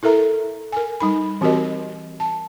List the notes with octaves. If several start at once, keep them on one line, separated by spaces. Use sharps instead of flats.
E4 A4 A#4 E5 A#5
A#4 G#5
G3 D#4 B5
E3 C4 F#4 G4 A#4 D#5
A5